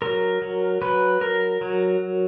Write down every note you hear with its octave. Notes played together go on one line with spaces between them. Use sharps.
F#3 A#4
F#3
F#3 B4
F#3 A#4
F#3